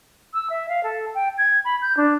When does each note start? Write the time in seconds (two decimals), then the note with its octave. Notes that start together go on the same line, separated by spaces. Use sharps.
0.34 E6
0.50 E5
0.69 F5
0.83 A4
1.14 G5
1.38 G#6
1.65 B5
1.82 G6
1.97 D4